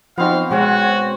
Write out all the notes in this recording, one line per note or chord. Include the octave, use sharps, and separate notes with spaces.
F3 B3 C4 D#4 F#4 F5
B2 G#3 C4 F#4 B4 C#5